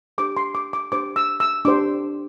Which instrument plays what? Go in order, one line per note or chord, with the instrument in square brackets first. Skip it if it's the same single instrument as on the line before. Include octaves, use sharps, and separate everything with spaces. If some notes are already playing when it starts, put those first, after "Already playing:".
[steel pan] D4 G4 C5 D6
C6
D6
D6
D4 G4 C5 D6
E6
E6
D4 G4 C5 D6